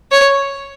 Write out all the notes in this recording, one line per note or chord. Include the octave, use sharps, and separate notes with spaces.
C#5